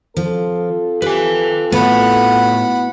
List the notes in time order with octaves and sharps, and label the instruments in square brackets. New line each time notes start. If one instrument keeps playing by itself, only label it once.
[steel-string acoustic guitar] F3 [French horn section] C4 F4 A4
[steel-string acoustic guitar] G4 [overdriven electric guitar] B4 G#5
[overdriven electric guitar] A2 [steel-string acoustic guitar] B3 E4 F#4 [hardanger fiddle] F#5 B5